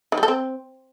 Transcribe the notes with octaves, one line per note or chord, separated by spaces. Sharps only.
D#3
G3
A4
C4